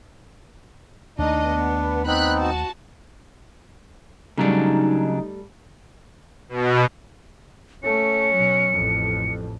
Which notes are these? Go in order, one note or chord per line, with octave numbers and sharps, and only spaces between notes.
D#2 A3 D4 D#4 D#5
B3
B3 C4 D#4 B5 F#6
F#4 A5
C#3 F#3 G3 A3 D4 D#4
B2
A3 C#4 C#7
B2 F#3
A1 F2